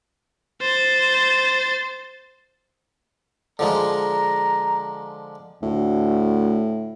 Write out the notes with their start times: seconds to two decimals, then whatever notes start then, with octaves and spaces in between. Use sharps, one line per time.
0.62 C5 A6
3.59 D3 F3 G#3 A#5
5.63 D2 A2